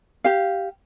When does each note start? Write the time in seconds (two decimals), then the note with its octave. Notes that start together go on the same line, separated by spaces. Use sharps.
0.24 G4 F5